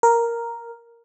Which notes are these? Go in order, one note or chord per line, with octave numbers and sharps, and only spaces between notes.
A#4